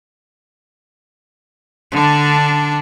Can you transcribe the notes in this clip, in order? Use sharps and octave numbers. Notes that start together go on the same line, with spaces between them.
D3 D4